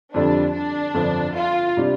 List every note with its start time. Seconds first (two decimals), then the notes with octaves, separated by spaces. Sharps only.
0.14 F2 D3 G3 D4
0.55 D4
0.94 G1 F2 D3 F3
1.35 F4
1.77 C3 G3 D4